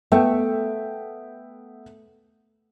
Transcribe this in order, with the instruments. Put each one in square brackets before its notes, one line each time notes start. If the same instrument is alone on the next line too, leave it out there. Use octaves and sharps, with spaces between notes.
[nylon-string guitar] A3 [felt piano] B3 E5 G5